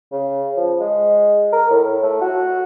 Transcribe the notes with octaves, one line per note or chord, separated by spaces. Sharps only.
C#3
F3
G#3
A#4
A2
A3
F#4